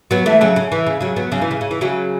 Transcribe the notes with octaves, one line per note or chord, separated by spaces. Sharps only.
F#3 B3
E3 A3
C#3 F#3
C#3
E3
C#3
C#3 F#3
F#3 B3
C#3 F#3
E3
C#3
C#3
E3
C#3 F#3